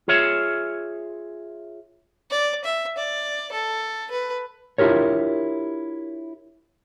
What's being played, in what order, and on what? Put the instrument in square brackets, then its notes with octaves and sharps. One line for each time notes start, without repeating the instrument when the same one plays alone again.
[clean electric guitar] F4 G#4 C#5 E5
[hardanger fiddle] D5
E5
D5
A4
B4
[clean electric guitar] D4 E4 F4 G4 A#4 C#5